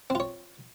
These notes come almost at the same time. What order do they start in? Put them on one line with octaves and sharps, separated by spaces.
C4 F4 C#5